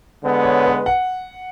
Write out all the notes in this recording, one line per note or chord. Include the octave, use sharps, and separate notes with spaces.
D3 G#3 B3
C#5
B4
F#5